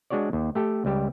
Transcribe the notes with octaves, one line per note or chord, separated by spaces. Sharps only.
G#3 D4 F#4 C#5 D5
D#2
A3 G4 A4 G5
C#2 G3 G4